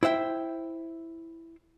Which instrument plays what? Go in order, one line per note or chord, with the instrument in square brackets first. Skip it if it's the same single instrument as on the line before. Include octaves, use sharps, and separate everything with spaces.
[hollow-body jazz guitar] E4 C5 E5 G5